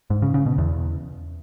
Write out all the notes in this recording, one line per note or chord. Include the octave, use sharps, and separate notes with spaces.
G#2
C#3
C#3
B2
E2